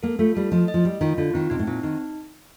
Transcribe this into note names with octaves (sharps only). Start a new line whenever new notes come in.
A#3 A4
A3 F4
G3 A4
F3 D#5
D#5
F3
G3 D#5
D#3 F4
D3 F4
D#3 C4
C3 D#4
A2
A#2 C4
D#3 D#4